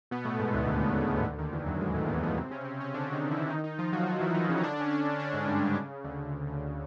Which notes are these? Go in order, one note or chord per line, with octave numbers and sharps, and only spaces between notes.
B2 B3
A2 A3
G#2 G#3
D2 D3
D#2 D#3
C#3
D2 D3
D2 D3
D#2 D#3
E2 E3
F#2 F#3
G#2 G#3
A2 A3
A#3
B2 B3
B2 B3
C3 C4
C#3 C#4
C3 C4
C#3 C#4
D3 D4
D4
D#3 D#4
E3 E4
D#3 D#4
D#3 D#4
F3 F4
F#3 F#4
F#3 F#4
E3 E4
D#3 D#4
C#3 C#4
D#4
D3 D4
C#4
D3 D4
C#4
D3 D4
G#2 G#3
G2 G3
C#3
C#3
D2 D3
C#3
C#3
C#3